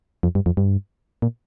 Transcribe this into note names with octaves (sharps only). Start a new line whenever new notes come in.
F2
G2
F2
G2
A#2